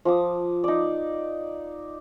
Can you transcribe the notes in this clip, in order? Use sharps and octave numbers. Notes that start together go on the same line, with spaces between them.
F3 D6 D#6
D#4 D5